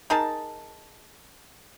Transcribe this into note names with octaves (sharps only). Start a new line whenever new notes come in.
D#4 G#4 A#4 A5